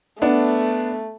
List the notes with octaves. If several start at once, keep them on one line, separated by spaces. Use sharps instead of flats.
A3 B3 D4